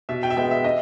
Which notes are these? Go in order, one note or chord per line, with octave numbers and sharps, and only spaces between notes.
B2 E5
G5
E5
G#3 B3 G5
E5
D#5